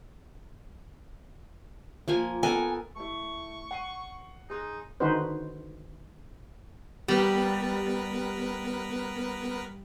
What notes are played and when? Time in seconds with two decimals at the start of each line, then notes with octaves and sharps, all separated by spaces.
2.08 F3 A#3 G#5
2.43 B3 A4 A#4 G#5
2.96 A3 E4 C#6
3.71 F#5 C7 D#7
4.50 D#4 G#4 C6 F#6
5.00 D3 D#3 D#4 F#4 B4 C5
7.08 G3 B3 G4 A#4 B4